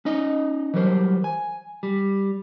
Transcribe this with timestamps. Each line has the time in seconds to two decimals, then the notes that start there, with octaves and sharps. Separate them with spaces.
0.05 C#4 D#4 D#5
0.74 E3 F#3 G3 A#4 C5
1.24 G#5
1.83 G3